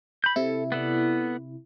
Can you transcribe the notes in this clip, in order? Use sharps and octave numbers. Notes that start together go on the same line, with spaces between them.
B5 G6
C3 E4 A4
B3 A4 D5